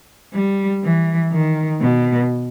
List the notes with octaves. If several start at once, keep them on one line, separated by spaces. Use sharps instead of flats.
G3
E3
D#3
B2